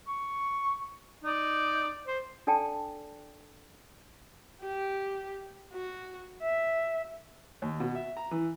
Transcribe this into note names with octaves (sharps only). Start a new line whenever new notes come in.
C#6
D#4 D5
C5
D4 A4 D5 G5 A5
G4
F#4
E5
D#2
B2
E5
A#5
E3